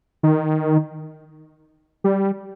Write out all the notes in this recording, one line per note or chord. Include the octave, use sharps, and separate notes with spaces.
D#3
G3